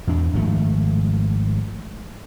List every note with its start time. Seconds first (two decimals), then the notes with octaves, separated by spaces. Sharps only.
0.07 E2 D4
0.33 G#1 F3 A3